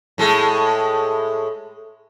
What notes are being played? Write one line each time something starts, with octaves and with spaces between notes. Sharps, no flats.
A2 G#3 A4